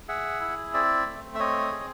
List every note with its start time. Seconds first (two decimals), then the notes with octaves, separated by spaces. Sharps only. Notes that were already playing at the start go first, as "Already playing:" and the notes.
0.08 G#4 E5 F#5
0.40 E4
0.73 C4 D5 E5
1.06 A3
1.35 E5
1.39 C4 C#5 D#5
1.72 G#4